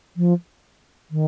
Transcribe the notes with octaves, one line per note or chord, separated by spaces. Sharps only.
F3
D#3